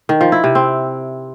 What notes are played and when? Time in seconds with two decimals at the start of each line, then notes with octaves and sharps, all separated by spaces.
0.09 D#3
0.21 F3
0.32 E4
0.44 C3
0.55 C4